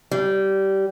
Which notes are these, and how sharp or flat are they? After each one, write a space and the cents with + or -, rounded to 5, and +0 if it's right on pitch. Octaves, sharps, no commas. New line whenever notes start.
G3 -20